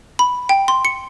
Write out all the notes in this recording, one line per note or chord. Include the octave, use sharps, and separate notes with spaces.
B5
G5
C6
C#7